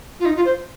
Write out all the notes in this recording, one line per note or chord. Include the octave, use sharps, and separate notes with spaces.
F4
D#4
F4
C5